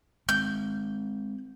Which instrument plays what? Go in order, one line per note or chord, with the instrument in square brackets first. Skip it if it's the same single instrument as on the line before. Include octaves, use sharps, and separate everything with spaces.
[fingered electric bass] G#3 C4 [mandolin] G6